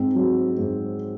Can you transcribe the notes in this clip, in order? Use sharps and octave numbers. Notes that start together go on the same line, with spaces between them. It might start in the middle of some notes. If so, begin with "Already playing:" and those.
Already playing: G#2 C4
F#3
G#2